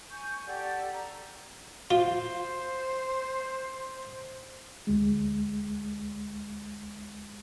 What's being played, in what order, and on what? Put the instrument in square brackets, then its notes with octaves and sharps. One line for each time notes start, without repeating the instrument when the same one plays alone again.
[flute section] G#5 C#6 G6
G4 A4 D5 F#5
A#5
[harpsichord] F4 [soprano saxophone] C5
[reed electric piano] D2 G#3